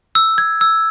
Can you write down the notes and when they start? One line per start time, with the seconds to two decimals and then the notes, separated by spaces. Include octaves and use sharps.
0.15 E6
0.38 G#6
0.61 E6